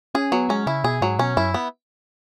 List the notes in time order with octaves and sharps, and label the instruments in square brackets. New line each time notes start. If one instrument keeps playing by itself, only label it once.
[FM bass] C#4 [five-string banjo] G#4
[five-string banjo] F#3 [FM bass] B3
[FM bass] G#3 [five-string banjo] C#4
[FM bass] C#3 [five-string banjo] E4
[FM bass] B2 [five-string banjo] G#4
[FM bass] G#2 [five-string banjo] F#3
[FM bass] B2 [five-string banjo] C#4
[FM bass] F#2 [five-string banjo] E4
[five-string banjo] B3